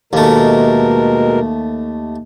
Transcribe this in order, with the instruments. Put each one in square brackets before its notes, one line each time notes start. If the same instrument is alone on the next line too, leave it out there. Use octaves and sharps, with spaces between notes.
[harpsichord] D#2 A3 [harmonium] B2 G#3 A#4